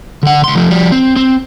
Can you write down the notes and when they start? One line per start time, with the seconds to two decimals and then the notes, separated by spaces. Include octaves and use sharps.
0.23 D3 F#5
0.44 C#2 C6
0.55 F3 A3
0.70 F3 G3
0.92 C4
1.16 C4